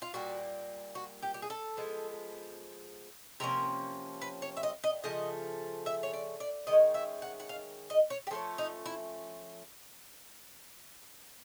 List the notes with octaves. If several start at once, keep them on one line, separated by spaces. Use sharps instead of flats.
F4
A#2 G3 A#3 F#4
F#4
G4
G4
G#4
A4
F3 G#3 B3
C3 F3 A#3 C#4 A#4
B4
C#5
E5
D#5
D#5
C#3 F3 A3 D#5
E5
C#5
D5
D5
D#3 G#3 C#4 D#5
E5
F#5
F#5
F5
D#5
C#5
G4
F3 A3 C#4 G#4
D#4
E4